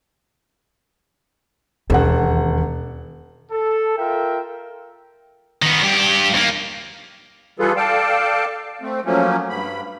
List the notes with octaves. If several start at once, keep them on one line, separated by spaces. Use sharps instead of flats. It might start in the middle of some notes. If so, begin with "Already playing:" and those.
E1 D#2 C#4 F#5
A4
F4 A#4 E5 G5
D#3 B3
G2 G4
D#2 A#3
E3 G3 F4 G#4 A4 B4
A4 D5 F5 G5 A5
A3 C4
F3 F#3 A3 A#3 C#4
G2 B5